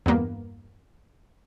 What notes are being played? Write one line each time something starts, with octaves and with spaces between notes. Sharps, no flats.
E2 G2 A#3 B3